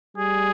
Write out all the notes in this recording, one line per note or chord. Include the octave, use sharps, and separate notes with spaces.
G3 G#4